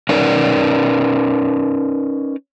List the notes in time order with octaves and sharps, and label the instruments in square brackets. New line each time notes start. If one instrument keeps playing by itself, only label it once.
[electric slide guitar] C#4 D#4 A#4 B4 D5